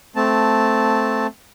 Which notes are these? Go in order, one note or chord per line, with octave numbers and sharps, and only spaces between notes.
A3 C4 A5